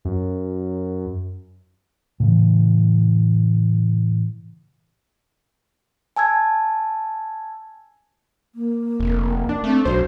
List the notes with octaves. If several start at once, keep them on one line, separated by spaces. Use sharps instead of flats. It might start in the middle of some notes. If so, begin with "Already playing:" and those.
F#2
A2 C#3 E3
G#5 A5 E6 G#6
A#3
F1
D4
A3 C4
B1 F#3 C5